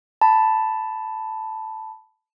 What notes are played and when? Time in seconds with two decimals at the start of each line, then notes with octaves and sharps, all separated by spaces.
0.21 A5 B5